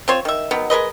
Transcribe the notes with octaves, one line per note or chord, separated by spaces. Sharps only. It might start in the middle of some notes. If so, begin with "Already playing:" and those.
C4 F4 C5 C#5
D#3 E5
D#3 F#3 B3
G#3 A#4 B4 D#5